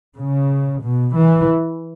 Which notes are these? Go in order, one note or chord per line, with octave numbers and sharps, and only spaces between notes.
C#3
B2
E3